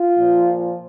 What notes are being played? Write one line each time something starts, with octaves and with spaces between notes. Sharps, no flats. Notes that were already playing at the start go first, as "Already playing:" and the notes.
Already playing: F4
A#2 F3